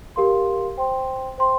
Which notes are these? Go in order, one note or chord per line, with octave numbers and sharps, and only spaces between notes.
G4 A#4 F5 C6
C5 G5 C6
C5 G5 C6